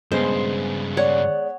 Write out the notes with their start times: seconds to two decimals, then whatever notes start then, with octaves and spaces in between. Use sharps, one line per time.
0.12 G2 C#3 G#3 B3 C5
0.97 C#5 D5 F#5